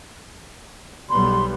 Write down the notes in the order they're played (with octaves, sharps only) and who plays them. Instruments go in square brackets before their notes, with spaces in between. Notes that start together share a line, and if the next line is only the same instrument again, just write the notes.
[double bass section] B1 G3 B3 [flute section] B5 C6